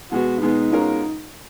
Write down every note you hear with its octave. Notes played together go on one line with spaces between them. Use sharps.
B2 G#3 B3 F#4
B2 G#3 B3 D#4
B2 G#3 C#4 F4 A#4